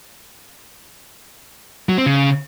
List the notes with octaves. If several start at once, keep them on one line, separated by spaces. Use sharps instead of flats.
F#3
C4
C#3